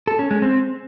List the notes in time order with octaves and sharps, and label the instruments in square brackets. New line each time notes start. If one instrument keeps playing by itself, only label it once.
[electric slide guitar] A4
C#4
G#3
C4